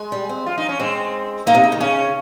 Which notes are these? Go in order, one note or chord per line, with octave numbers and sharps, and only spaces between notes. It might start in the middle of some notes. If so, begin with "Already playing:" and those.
Already playing: G#3
G3
C4
F4
D#4
C#4
G#3 C4
A#3 D#4
C3
C#3
D#3
C#3 C#4